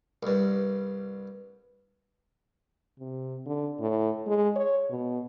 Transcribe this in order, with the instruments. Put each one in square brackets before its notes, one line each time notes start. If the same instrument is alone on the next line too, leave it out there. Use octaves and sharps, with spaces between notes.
[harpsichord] C2 G2
[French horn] C3
D3
A2
G#3
C#5
B2